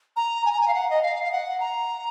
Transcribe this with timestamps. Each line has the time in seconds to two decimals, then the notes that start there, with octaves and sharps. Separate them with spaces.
0.17 A#5
0.46 G#5
0.52 A#5
0.61 G#5
0.68 F5
0.74 F#5
0.90 D#5
1.03 F5
1.24 F5
1.32 F#5
1.60 A#5